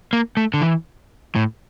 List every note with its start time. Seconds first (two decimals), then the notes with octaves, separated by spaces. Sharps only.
0.13 A#3
0.37 A3
0.54 D3
0.61 E3
1.35 A2